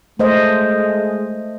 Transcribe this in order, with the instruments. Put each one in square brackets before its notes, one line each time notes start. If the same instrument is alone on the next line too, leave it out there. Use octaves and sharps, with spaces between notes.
[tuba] G#3 [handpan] A3 C5 D#5